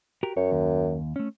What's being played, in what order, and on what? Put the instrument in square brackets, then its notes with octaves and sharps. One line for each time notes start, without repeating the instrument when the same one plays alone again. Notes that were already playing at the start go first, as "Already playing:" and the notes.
[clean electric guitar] F#4 G4 A#4
[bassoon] F#2 [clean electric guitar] C#5
[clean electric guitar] D#2
A3 C#4